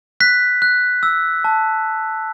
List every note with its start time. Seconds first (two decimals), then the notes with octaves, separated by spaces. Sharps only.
0.20 F#6 B6
0.62 F#6
1.03 E6
1.44 A5